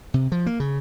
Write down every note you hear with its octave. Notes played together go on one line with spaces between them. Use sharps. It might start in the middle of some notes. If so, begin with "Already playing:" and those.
C3
F3
A#3
C#3